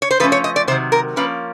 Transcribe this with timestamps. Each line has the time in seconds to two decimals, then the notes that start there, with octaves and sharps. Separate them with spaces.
0.02 C#5
0.11 C5
0.20 F3 A3 C#4 B4
0.32 C#5
0.44 D#5
0.56 D5
0.68 C3 D#3 F#3 C5
0.92 A#4
1.16 F3 A#3 C#4 B4